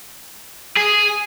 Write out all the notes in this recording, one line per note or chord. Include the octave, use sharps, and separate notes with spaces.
G#4